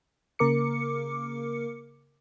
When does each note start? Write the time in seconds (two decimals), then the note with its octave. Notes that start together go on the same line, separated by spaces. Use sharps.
0.39 C#3 A#3 A#4 D6 C#7